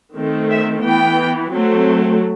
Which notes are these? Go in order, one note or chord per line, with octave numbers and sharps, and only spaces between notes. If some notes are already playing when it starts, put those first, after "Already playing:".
D#3 A3 C4
E5
E3 B3 G5
F#3 A3 C4